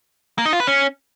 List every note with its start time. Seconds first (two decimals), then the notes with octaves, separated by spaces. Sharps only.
0.38 A#3
0.46 D#4
0.53 F4
0.60 B4
0.67 C#4